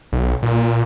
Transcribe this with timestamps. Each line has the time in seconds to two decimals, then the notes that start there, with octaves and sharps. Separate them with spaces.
0.13 B1
0.43 A#2